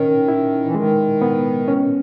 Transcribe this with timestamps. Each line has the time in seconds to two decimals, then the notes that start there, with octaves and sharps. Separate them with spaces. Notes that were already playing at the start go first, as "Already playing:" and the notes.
Already playing: D#3 C#4
0.28 E4
0.65 E3
0.75 D#3 G#3
1.22 B3
1.68 C#4